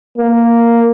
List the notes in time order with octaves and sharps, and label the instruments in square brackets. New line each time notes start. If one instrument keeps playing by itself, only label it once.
[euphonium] A#3